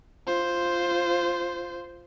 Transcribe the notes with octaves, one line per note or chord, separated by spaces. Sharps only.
F4 C5